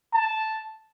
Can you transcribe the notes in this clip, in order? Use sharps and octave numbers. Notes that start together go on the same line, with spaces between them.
A5